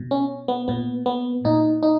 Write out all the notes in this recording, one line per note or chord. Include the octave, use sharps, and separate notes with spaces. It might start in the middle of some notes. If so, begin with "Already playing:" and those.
Already playing: B2
C#4
B3
A#2 B3
B3
A#2 D#4
D#4